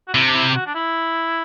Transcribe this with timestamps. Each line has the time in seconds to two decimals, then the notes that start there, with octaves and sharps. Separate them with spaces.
0.08 F#4
0.14 C3 E4
0.25 D4
0.34 E4
0.49 G4
0.55 F#4
0.66 D4
0.75 E4